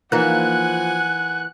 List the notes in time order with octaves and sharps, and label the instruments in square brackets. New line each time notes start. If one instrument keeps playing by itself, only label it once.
[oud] E3 A#3 D#4 [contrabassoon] F3 [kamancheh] F#5 G#5 [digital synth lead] F#6